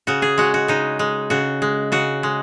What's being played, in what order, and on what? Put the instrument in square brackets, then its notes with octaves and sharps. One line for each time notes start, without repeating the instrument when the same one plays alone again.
[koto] C#3 F#4
G#4
G#3 F#4
F#4
C#3 D#4
G#3
C#3 F#4
G#3
C#3 F#4
G#3